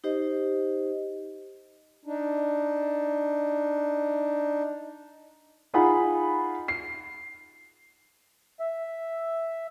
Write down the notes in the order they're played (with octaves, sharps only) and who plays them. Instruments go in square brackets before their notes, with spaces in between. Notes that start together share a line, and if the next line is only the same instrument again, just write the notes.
[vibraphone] D#4 G4 C5 D#5
[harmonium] D4 D#4
[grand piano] D#4 F4 G#4 F#5 B5
C7
[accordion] E5